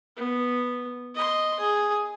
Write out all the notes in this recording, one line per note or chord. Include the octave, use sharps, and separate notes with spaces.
B3
D#5 C6
G#4